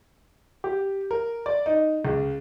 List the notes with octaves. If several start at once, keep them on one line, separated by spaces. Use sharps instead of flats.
G4
A#4
D5
D#4
C#2